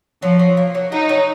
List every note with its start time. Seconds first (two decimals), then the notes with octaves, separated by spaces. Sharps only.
0.22 F3 F#3
0.39 F#3
0.57 A#3
0.75 F#3
0.92 F#3 D#4
1.09 F#3